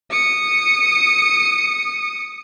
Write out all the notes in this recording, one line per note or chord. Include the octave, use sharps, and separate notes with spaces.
D#6 C#7